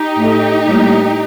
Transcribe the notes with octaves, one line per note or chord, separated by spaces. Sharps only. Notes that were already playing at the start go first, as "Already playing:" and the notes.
Already playing: D#4 G4
A2 A3
A2 G3 A#3